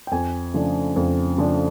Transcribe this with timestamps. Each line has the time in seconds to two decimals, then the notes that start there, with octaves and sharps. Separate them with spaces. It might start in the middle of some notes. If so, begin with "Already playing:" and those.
0.07 G5
0.11 F2 G#5
0.54 C#3 F3 A3 D4
0.96 F2
1.38 C#3 F3 A3 D4